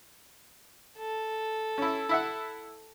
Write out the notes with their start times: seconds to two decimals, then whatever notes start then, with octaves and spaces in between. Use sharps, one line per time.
0.98 A4
1.78 C#4 E4
2.09 E4 E5 F#5